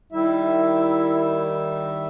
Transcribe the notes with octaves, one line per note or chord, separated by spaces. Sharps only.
D#3 G3 E4 E5